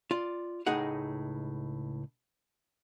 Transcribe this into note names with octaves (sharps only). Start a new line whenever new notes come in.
F4 D5
C#2 A2 D#4 G#4 D#5 F#5